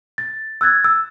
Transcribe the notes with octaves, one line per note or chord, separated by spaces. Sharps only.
A6
E6 F#6 G#6 A6
E6